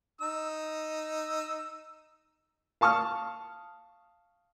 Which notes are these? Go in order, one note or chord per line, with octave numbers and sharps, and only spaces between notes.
D#4 E6
F5 A5 C#6 D#6 F6